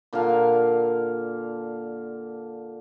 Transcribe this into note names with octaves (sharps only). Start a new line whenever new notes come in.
A#2 D3 A#4 F5